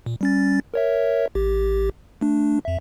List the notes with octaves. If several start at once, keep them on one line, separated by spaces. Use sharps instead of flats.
A#2
G3 C#4 A6
A#4 C#5 E5
A1 G4
A3 D4
F2 E5